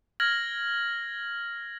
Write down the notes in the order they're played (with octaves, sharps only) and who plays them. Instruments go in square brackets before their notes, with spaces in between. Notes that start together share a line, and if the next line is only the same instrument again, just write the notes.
[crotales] F6 G#6 A#6 F#7